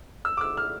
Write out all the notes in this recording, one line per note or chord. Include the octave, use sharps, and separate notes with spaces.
E6
D6
E6
F6